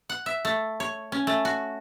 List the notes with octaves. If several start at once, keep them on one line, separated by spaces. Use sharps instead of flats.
F#5
E5
A3
C#5
C#4
A3
F#4